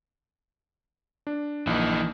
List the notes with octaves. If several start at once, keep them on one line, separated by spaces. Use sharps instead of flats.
D4
A#1 E3 D#4